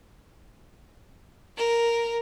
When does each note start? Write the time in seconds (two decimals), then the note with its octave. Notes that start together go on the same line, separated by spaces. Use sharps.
1.57 A#4